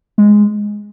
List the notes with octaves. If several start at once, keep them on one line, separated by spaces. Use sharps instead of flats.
G#3